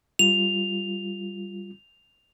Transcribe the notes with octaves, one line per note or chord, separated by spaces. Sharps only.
G3 F4 F7